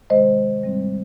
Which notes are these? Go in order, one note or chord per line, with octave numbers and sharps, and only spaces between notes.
C3 D#3 G#3 C5 D#5
G#2 G3 C4